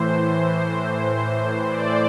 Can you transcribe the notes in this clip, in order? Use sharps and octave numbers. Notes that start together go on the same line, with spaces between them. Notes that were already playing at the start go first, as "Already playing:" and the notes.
Already playing: A2 E3 C5
D5